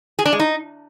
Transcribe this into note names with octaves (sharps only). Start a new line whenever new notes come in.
G#4
D4
G#3
D#4